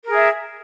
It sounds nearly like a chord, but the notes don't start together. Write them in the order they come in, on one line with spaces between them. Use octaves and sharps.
A#4 G#4 E5